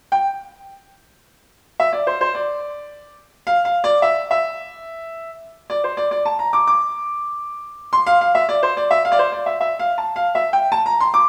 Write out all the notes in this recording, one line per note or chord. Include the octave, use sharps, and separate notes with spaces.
G5
E5
D5
C5
C5
D5
F5
F5
D5
E5
E5
D5
C5
D5
D5
A5
A#5
D6
D6
C6
F5
F5
E5
D5
C5
D5
E5
F5
D5
C5
D5
E5
E5
F5
A5
F5
E5
G5
A5
A#5
C6
D6